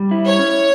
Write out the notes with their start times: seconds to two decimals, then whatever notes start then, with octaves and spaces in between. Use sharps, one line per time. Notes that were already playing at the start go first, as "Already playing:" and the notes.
Already playing: G3
0.11 E4
0.26 C#5
0.39 C#4